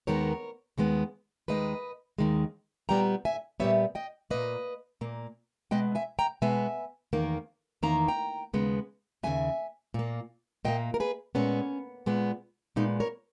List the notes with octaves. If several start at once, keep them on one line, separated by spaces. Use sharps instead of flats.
D#2 D#3 G#3 B3 A#4 C#5
D#2 D#3 G#3 B3
D#2 D#3 G#3 B4 D#5
D#2 D#3 G#3
A#2 G3 B3 G5 A#5
E5 G#5
A#2 G3 B3 C#5 E5
D#5 G5
A#2 A#3 B4 D#5
A#2 A#3
B2 G#3 B3 D#5 G5
E5 G#5
G5 A#5
B2 G#3 B3 E5 G#5
E2 D#3 A#3
E2 D#3 A#3 A#5
G5 A#5
D#2 C#3 G#3 B3
D#2 C#3 G#3 B3 E5 G#5
A#2 A#3
A#2 A#3 D#5 G5
A#4
G#4 B4
A#2 G#3 B3 C#4
A#2 G#3 B3
A#2 G#3 B3 D#4
A#4 C#5